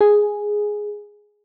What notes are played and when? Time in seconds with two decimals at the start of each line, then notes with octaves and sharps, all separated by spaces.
0.01 G#4